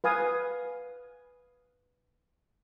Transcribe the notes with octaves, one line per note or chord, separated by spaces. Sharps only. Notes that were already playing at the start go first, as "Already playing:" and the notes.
B4 F5 G#5 D#6